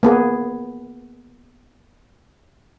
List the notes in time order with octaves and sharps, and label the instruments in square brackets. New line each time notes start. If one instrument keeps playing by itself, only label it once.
[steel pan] A#3 B3 G#4